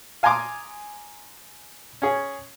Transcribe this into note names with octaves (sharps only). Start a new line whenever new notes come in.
F5 G#5 A#5 C6 D6 D#6
C#4 G#4